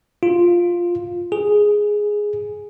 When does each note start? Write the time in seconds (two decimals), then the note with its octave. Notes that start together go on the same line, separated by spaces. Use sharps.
0.23 F4
1.32 G#4